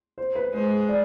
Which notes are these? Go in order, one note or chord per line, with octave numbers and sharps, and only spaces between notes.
C5
B4
G#3 C5
D5